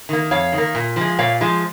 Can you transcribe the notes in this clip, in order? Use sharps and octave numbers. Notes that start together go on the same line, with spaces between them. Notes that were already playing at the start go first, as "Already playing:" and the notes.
D#3 A#3
F2 C#5 F5
D#3
A#3
A#2
F3 G#3
A#2 C#5 F5
F3 G#3